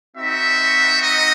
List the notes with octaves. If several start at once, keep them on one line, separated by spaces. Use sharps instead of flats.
C4 D#4 F#4 E5
D#5